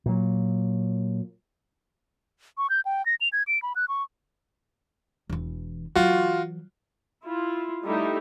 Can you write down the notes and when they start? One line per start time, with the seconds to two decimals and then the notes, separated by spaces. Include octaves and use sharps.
0.06 A#2 F#3
2.58 C#6
2.70 G6
2.85 G5
3.06 A#6
3.21 F7
3.33 G#6
3.47 D7
3.62 B5
3.76 F#6
3.88 C#6
5.30 E1 E3
5.95 E3 F#3 F4 F#4
7.25 E4 F4
7.85 G3 A3 D#4 E4 G4